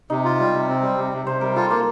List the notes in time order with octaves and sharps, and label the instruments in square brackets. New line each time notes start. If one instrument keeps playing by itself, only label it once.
[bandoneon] C3 [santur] D#4
[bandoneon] F4
G3
C3
C4
G3
C3
C3
[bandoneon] C3 [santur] C5
[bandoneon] G3 [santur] A#4
[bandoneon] F4 [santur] A4
[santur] A#3 [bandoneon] F4